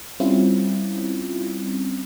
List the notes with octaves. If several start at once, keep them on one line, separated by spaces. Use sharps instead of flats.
G3 C4 C#4 E4 F4